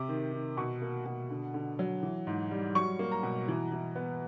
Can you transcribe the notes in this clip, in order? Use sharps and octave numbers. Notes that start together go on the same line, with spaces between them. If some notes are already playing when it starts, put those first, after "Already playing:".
Already playing: C3 D6
D#3
D#3
B2 C#6
A#3
B2
D3
D3
F#3
E3
G#2
G3
F#3 C#6
A#3
A#5
B2
E3
E3
B3